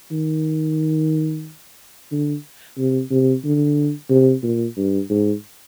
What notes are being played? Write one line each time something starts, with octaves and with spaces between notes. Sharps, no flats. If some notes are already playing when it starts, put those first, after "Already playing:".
D#3
D3
C3
C3
D3
C3
A#2
G2
G#2